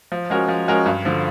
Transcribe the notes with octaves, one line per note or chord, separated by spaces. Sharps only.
F3
G#3 C#4 F#4 A#4
F3
G#3 C#4 F#4 A#4
G2
D3 F3